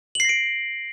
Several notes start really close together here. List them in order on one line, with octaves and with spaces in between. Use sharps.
F#7 C7 A#6 D7